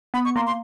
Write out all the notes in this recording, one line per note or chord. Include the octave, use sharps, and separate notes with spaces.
B3 B5
C#6
A#3 C6
C6